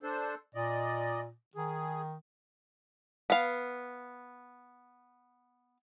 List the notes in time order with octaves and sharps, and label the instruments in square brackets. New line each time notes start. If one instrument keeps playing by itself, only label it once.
[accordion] D4 A4 C5
[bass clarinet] A#2 [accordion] D5 D#5
[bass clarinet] D#3 [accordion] G#4
[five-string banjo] B3 F5